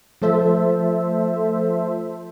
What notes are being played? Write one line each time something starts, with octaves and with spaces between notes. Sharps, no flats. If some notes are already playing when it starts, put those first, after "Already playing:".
F3 A3 A4 C5 E5